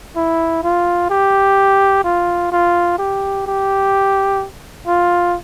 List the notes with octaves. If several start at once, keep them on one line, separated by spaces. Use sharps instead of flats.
E4
F4
G4
F4
F4
G4
G4
F4